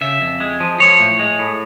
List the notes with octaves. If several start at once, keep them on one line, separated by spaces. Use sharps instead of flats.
C#3 E5
F2
G#3
F3
F3 C#5
A2
G#3
A2